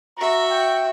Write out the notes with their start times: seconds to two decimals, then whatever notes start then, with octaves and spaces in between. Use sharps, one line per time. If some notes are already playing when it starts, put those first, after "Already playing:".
0.18 F#4 E5 A#5
0.51 G5